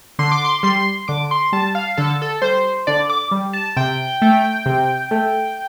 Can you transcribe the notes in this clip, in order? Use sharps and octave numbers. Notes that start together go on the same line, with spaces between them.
D3 C6
D6
C6
G3 C6
D3 D6
C6
G3 A5
F5
D3 A4
A4
G3 C5
D3 D5
D6
G3
A5
C3 G5
A3
C3
A3